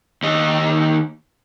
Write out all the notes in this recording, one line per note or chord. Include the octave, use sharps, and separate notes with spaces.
D#2 D#5